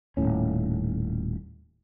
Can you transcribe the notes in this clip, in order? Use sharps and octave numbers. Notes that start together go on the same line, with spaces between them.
D#1 B1 A2 C#4